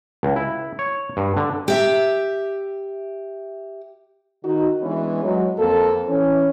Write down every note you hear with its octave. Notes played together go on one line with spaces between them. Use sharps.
C#2
E4
C#5
G2
D3
G4 E5
D#3 D#4 F#4
E3 G#3 B3 C#4 D4 B4
F#3 G#3
F2 A#3 A4
E3 C#4